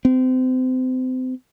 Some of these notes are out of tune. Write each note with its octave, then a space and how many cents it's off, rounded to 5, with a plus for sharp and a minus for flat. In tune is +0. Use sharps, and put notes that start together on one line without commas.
C4 -30